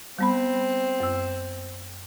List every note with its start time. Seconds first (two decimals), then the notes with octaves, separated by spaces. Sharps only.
0.19 G3 B3 C4 B5
1.00 F#2 E6